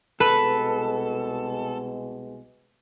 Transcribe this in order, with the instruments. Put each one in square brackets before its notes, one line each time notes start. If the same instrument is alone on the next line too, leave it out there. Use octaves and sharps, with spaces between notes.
[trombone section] C2 B2 G#3 [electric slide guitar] A4 [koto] B4